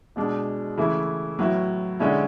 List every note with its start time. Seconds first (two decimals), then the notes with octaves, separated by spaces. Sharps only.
0.16 B2 G#3 D4
0.77 C#3 E3 A3 E4
1.39 A2 F#3 B3 E4
1.99 D3 G#3 C#4 E4